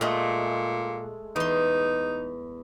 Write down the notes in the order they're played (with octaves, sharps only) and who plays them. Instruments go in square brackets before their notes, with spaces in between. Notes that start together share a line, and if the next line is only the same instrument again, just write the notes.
[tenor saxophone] A#2 [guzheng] G#3 A3
[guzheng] E2 C6 [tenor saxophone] D#4